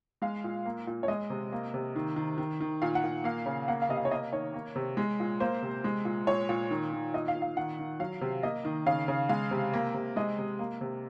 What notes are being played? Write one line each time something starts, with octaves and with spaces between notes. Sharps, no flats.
G#3 F5
A#2
A#3
A#2
C#5
G#3 D#5
C3
A#3
C3
D#3
D#3
D#3
D#3
A#2 F5
F#5
A#2
A#3 F5
C#3
A#3 F#5
F5
C3 D#5
F5
C#5
A#3 D#5
D#3 C#5
A#3
C3
G#3
A#2
A#3 C5
C3
G#3
A#2
A#2 C#5
A#2
D#3
D#3
A#2 D#5
F5
A#2
F5
D#3 F#5
D#3
F#3 F5
C3
A#3 D#5
D#3
C#3 F5
C#3
G#3 F5
C3
A#3
C3
G#3 D#5
C3
A#3
C3